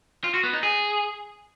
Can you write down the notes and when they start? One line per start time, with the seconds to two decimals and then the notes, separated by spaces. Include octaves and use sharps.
0.24 F4
0.34 F#4
0.43 B3
0.53 D#4
0.63 G#4